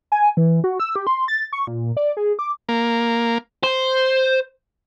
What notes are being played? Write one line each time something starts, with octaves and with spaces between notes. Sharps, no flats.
G#5
E3
F#4
E6
G4
C6
A6
C#6
A#2
D5
G#4
D6
A#3
C5